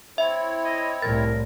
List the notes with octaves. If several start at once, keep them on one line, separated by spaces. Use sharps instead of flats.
C4 E4 C#5 E5
D#5
C2 A2 A#4 A6